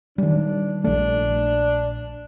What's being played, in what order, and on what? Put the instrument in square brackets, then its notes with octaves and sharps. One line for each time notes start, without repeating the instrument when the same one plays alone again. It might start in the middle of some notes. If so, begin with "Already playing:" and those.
[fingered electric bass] D#3 G3 [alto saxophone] D4
[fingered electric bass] A#1 A3 [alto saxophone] D4